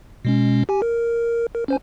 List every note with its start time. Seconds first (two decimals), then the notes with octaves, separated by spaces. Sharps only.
0.25 B2 G#3 C#4
0.69 G4 G#5
0.82 A#4
1.55 A#4
1.68 C#4 C5 G#5